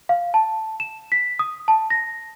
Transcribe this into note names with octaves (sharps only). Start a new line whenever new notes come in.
F5
A5
E7
B6
D#6
A5
A#6